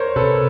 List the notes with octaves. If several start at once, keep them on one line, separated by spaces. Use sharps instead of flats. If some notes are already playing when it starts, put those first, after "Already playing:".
Already playing: A#4 C5 C#5
C3 A4 B4